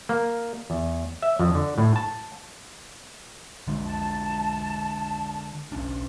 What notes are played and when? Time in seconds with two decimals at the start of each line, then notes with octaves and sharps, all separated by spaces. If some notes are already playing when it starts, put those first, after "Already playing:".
0.09 A#3
0.70 E2
1.22 E5
1.39 F2
1.55 D3
1.78 A2
1.96 A5
3.68 D3 G#3 D4
3.85 A5
5.72 B1 C#4 D4